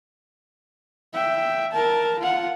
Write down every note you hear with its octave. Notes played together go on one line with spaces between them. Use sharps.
E5 G5
A#4 A5
F4 F#5